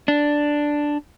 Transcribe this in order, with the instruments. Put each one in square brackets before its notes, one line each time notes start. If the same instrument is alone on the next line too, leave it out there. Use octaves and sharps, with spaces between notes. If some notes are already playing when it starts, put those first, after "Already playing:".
[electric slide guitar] D4